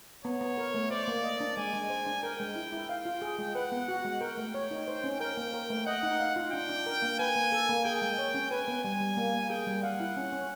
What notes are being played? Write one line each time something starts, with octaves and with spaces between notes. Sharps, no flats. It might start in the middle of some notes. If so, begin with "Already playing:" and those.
B3 C#5
B3
A#4
A3
C5 D5
A#3
D#5
D4
G#3 G#5
G#3
C5
D4
A#4 G5
G#3
E4
E4
F5 G5
F4
G#4
G#3
B4 F#5
B3
F#4
G#3
A#4 G5
A3
C#5
D#4
C5
C#4
A#4 G5
A#3
A#4
A3
D#5 F#5
D#4
F5
F4
D4 G5
D4
A#4
A#3
B4 G#5
A#3
A4
A#3
G#4 G5
G#3
C#5
C#4
B4 G#5
B3
G3 G#5
G3
A#3
A#3
G#4 G5
G3
F5 F#5
E4
C#4
C#4